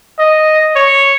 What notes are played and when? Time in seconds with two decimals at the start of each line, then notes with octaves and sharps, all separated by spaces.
0.19 D#5
0.76 C#5